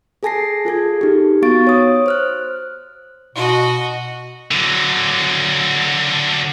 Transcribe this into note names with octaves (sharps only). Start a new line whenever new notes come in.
G#4 A4 G#5 A5 A#6 C7
F4 G#4 A4 G#6
D#4 G4
B3 F#4 F5 C#6 A6 D7
C#5 D#6
C5 F6 F#6
B2 F#4 D#5
D3 F#3